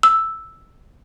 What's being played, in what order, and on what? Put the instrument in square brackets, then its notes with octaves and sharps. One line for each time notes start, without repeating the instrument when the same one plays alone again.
[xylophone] E6